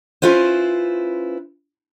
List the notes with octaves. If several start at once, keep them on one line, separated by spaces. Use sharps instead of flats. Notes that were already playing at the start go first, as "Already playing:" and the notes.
C#4 E4 F4 B4 C5